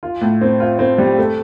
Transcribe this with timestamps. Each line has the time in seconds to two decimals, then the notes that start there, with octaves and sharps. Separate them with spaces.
0.03 F4
0.21 A2
0.41 C4
0.60 F4
0.79 C4
0.98 G3
1.18 A3